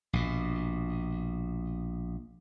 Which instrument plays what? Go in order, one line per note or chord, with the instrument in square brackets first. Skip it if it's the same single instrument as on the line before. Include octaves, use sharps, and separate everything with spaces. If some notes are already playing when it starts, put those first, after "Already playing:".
[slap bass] A#1 B2